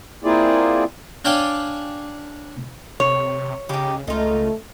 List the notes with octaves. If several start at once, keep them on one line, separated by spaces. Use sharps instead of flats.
A#3 C4 E4 F4 G#4 D5
D4 C#5 D5 F5 G5 G#5
C3 C#5
C#3 D#4 G4
C#2 A3 D#4 F4